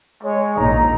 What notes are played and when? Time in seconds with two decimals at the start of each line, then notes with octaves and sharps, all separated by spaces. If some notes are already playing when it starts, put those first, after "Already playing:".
0.23 G#3 C#5
0.58 A#1 D#2 G#2 D#4 A#5